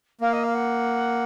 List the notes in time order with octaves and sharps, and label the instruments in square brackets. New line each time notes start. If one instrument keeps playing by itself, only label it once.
[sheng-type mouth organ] A#3 [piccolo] F5
[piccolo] D#5
F5
F#5